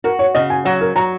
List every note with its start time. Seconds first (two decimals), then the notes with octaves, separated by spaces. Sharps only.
0.04 F#4 A#4
0.19 C#5
0.35 C#3 D#5
0.50 G#5
0.65 F#3 F#5
0.81 A#4
0.96 F#3 A#5